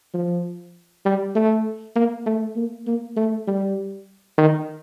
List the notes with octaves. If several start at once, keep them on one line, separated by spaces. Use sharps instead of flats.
F3
G3
A3
A#3
A3
A#3
A#3
A3
G3
D#3